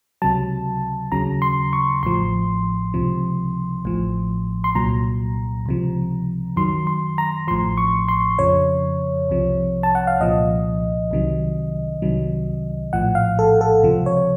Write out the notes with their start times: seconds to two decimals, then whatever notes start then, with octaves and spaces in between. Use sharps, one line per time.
0.22 C#2 C3 F#3 A5
1.12 D#2 C#3 F#3 A#5
1.42 C6
1.73 C#6
2.03 A1 A2 F3 C6
2.94 C#2 C3 F3
3.85 A1 A2 F3
4.64 C6
4.75 C2 A#2 F#3 A#5
5.66 C#2 C3 F3
6.56 F#2 D#3 F#3 C6
6.87 C6
7.18 A#5
7.48 A1 A2 F3 C6
7.77 C#6
8.08 C6
8.39 F2 C#3 F3 C#5
9.29 C2 C3 F3
9.83 A5
9.95 F#5
10.07 F5
10.20 C2 A#2 F3 D#5
11.11 C2 C3 D#3 F#3
12.02 C2 C3 D#3 F#3
12.93 A#1 A2 F3 F#5
13.15 F5
13.39 A4
13.61 A4
13.83 C#2 C3 F3
14.06 C#5